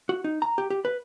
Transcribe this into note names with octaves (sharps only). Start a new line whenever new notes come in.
F#4
D#4
A#5
G4
G4
B4